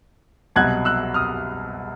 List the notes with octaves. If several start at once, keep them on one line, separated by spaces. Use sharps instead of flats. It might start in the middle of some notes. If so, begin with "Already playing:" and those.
C2 B2 F#3 F#6 G#6
E6 F#6
D#6 F6